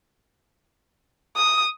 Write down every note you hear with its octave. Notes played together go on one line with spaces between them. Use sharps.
D#6